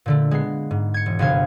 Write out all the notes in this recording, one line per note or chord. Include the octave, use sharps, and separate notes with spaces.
A#2 D3 A3
G#3 B3 C7
G#2
G#6 C#7
E1
G1 C3 B3 F#4 F5 G#6